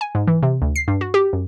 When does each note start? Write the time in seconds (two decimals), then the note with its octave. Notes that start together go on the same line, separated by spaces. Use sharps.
0.01 G#5
0.15 G#2
0.27 E3
0.43 C3
0.62 D2
0.76 C7
0.88 G2
1.01 F#4
1.14 G4
1.33 F#2